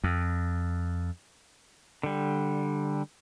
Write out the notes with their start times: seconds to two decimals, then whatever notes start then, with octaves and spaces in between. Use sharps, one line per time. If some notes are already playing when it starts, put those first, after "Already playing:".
0.04 F2
2.03 D3 G3